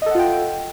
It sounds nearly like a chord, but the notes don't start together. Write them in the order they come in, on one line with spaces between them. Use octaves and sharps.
D#5 A4 F#5 F4 G5